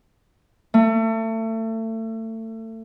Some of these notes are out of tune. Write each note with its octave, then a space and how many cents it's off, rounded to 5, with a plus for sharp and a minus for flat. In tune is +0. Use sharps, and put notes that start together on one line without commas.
A3 +30